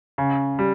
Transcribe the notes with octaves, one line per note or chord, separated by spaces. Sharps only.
C#3
G3